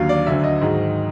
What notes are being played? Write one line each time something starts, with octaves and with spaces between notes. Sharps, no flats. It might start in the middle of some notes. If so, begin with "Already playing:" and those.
Already playing: D#2 D3 F#3 F5
D5
D2 D3 F#3 E5
D#5
G#2 D#3 F#3